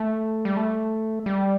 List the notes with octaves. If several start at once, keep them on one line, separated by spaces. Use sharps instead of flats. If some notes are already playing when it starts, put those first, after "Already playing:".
Already playing: A3
G3
A3
G3